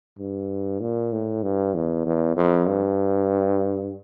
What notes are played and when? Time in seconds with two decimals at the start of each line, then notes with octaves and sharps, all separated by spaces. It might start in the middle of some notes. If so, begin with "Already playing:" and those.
0.19 G2
0.81 A#2
1.12 A2
1.43 G2
1.75 E2
2.06 E2
2.36 F2
2.68 G2